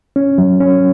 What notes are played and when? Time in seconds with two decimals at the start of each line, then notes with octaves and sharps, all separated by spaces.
0.16 C#4
0.38 F#3
0.60 C#4